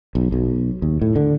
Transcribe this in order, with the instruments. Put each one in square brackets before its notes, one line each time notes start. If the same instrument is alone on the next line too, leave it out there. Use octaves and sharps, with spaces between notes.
[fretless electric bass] B1
B1
D#2
A2
D3